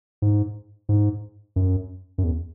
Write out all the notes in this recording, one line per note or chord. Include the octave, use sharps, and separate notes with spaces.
G#2
G#2
F#2
F#2
E2